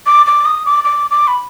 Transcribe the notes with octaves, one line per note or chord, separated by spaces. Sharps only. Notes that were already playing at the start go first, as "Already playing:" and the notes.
D6
D6
D#6
D6
D6
D6
B5